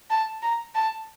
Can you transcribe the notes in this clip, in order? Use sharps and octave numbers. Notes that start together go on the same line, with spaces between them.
A5
A#5
A5